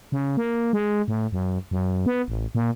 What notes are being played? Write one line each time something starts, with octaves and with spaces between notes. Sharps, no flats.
C#3
A#3
G#3
A2
F#2
F#2
B3
A1
A#2